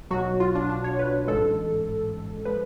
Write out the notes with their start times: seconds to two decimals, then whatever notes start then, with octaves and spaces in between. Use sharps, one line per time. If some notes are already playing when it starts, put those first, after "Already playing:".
0.11 B1 B2 F#3 F#4
0.40 F4
0.55 D4
0.70 D4
0.84 C#5
0.99 B4
1.28 A1 G#2 G#3 A4
2.45 F3 G#3 B4